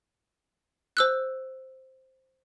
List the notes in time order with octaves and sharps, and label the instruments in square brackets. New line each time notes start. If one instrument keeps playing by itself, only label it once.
[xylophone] C5 E6 F#6